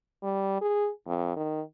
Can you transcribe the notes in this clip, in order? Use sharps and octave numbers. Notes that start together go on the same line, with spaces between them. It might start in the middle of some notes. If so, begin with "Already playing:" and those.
G3
G#4
F2
D#3